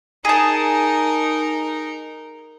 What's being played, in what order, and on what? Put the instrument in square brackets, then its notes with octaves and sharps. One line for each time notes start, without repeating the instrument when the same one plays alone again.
[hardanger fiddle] D#4 A#4 [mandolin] G#4 A5